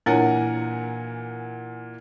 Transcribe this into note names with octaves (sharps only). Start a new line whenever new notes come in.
A#2 E3 D4 A#4 C#5 F#5 G#5